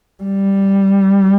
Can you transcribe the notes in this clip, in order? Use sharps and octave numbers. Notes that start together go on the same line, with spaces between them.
G3